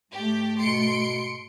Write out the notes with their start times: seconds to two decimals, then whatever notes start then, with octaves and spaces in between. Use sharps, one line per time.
0.12 G#2 A3 G4
0.60 B2 C6 C#7 D7